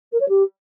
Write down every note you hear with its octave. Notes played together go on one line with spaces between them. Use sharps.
A#4
C#5
G4